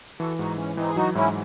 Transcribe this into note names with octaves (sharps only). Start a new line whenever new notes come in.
E3 F#4 A4
G#2 D#4 F#4
E3 C#4
E3 C4 D#4
G#4
F#3 D#4 F#4
G#2 C#4 E4